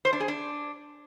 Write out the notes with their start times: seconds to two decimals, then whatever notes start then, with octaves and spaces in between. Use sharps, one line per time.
0.05 C5
0.13 D4
0.20 G#4
0.28 D4